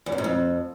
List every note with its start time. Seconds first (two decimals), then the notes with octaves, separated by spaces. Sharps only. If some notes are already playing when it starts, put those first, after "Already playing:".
0.06 E2
0.12 F#2
0.18 G#2
0.24 F2